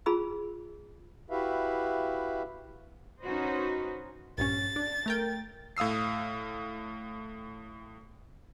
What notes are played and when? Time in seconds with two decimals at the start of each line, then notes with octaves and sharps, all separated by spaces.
0.06 F4 G#4 B5 E6
1.30 E4 F#4 G4 B4 E5 F5
3.22 C#4 D#4 F#4 B4 C5 D#5
4.38 A#1 G2 C#4 A6
4.76 D4
5.06 A3 A#4 G5
5.77 A2 F5 D#6 E6 C7